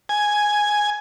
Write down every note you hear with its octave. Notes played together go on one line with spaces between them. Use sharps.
G#5